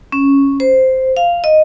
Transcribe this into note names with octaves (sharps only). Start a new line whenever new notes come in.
C#4
C5
F5
D#5